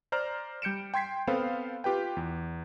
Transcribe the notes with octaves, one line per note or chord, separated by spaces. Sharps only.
C5 D5 A#5 F6
G3 G6 C#7 D7 E7
G5 C6 G#6 B6 C7
B3 C4 A4 C5 F5 B5
F4 G4 B4 G5
E2